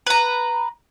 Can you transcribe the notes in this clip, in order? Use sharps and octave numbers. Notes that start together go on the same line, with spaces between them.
B4 A#5